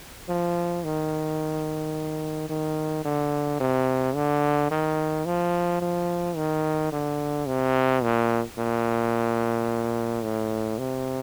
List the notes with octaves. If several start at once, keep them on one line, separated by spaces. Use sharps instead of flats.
F3
D#3
D#3
D3
C3
D3
D#3
F3
F3
D#3
D3
C3
A#2
A#2
A2
C3